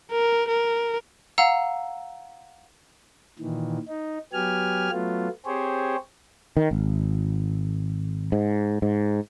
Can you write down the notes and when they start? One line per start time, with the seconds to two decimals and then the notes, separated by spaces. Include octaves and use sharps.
0.11 A#4
0.48 A#4
1.38 F5 F#5 A#5 E6
3.39 A#2 D#3 E3
3.88 D#4
4.33 F#3 B3 G4 G#5 F6
4.91 F#3 A3 B3 F4
5.46 C4 G4 G#4 C5 C#5
6.57 D#3
6.71 G#1
8.32 G#2
8.82 G#2